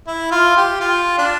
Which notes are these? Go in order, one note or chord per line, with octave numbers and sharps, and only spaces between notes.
E4
F4
G4
F4
D4